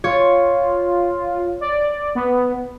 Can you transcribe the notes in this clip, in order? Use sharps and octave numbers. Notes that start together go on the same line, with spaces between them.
F4 C#5
D5
B3